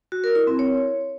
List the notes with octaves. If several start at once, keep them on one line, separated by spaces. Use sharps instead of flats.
F#4
A#4
E4
C4
C#5